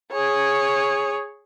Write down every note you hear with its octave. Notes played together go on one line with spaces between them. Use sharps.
G#4 C#5